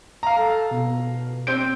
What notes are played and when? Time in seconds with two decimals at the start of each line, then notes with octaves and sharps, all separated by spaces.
0.23 F5 A#5
0.36 A4
0.71 B2
1.47 C4 G6 D7